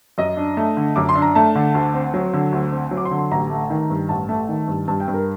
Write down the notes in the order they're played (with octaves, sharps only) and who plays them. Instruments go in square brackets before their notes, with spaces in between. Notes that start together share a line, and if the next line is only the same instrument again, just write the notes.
[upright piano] F#2 D#5
D4
A3
D3
F#2 D6
C6
D4
A#5
A3 A5
D3
D2
C4
F#3
D3
D2
C4
F#3
D6
C6
D3
C6
A1 A#5
A3
D#3
G2
A1 A5
A3
D#3
G2
G2 A5
G5
G2
A#4